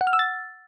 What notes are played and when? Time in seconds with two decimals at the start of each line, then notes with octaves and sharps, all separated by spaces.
0.01 F#5
0.07 F6
0.13 E6
0.19 A6